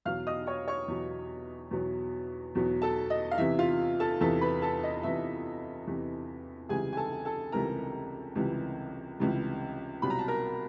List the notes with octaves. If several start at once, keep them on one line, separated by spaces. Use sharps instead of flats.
E2 B2 F#3 F5 F6
D#5 D#6
C#5 C#6
C#5 C#6
E2 B2 F#3
E2 B2 F#3
E2 B2 F#3
A4 A5
D#5
F5
E2 C3 E3 E5
F4 F5
A4 A5
E2 C3 E3 A4 A5
B4 B5
A4 A5
D#5
E2 C3 E3 E5
E2 C3 E3
C#2 C3 E3 G3 G#4 G#5
G#5
A4 A5
A4 A5
C#2 C3 E3 G3 A#4 A#5
C#2 C3 E3 G3
C#2 C3 E3 G3
C2 B2 F#3 B5
A#5
A5
A#4 A#5